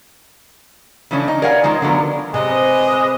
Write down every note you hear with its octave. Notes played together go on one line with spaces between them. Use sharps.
C#3 E3 F3 A3 C#4 D4
D#4
A#4 C#5 D5 F5 F#5 G#5
D#3 F3 G#3 D#4
D3 F3 F#3 B3 A#4
C3 G#3 B4 D#5